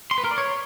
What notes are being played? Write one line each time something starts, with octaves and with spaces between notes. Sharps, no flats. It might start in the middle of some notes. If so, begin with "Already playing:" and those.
C6
B4
A#4
D5
C#5